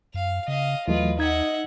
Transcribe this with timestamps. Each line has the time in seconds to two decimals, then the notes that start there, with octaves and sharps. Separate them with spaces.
0.14 F#2 F5
0.48 C#3 D#5 F5
0.88 D#2 E3 F#3 A3 F4 B4 D#5
1.19 D#4 D#5 E5 F#5 G#6